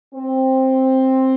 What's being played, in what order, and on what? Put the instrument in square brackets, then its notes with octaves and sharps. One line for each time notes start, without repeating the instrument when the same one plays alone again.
[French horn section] C4